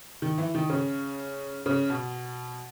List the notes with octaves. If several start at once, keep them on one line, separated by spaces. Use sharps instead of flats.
D#3
E3
D#3
C#3
C#3
B2